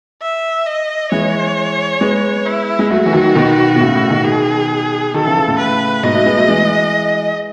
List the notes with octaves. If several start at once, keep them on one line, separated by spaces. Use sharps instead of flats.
E5
D#5
E3 G#3 C#5
G#3 B3
E4
G#3
F#3 A3 F#4
E3
D#3 F#3
B2 D#3
B2
A2 C#3
A2 C#3
B2 D#3
G#4
D#3 F#3 A4
C#3 E3
C#3 E3
A2 C#3
B4
G#2 B2 D#5
F#3 A3
G#3 B3
F#3 A3
E3 G#3